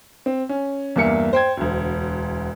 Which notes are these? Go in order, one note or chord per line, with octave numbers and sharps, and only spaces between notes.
C4
C#4
E2 G2 A#3 E5 C#7
C5 G5 G#6
E1 D2